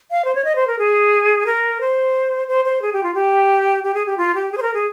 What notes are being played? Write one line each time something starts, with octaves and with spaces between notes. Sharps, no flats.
F5
C5
C#5
D#5
C5
A#4
G#4
A#4
C5
C5
C5
G#4
G4
F4
G4
G4
G#4
G4
F4
G4
G#4
C5
A#4
G#4